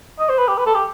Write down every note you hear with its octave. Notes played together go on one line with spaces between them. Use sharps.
D#5
C5
B4
G4
B4
A4
G4